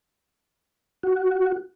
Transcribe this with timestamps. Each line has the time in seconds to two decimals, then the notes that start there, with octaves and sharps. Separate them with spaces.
1.03 F#4